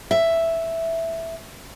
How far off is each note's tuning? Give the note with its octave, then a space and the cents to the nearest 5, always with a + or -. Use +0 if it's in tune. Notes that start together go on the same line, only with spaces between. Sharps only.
E5 +0